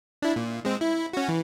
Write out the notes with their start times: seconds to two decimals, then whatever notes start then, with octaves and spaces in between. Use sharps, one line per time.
0.22 D4 E4
0.36 A#2
0.65 G#3 C4
0.81 E4
1.13 C#4 F#4
1.28 E3